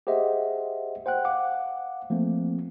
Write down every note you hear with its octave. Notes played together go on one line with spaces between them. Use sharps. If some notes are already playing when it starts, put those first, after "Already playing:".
G4 G#4 C5 D#5 E5 F#5
C5 F#5 G5 F#6
F5 F#5 D6
F3 A3 A#3 C4